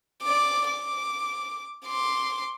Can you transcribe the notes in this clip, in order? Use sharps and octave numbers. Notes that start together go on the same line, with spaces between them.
D5 D6
D6
C6 D6